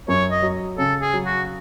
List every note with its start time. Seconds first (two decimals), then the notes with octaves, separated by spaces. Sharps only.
0.08 F#2 C#5
0.31 D#5
0.42 F#3
0.78 C#3 A4
1.01 G#4
1.13 F#3
1.25 F#4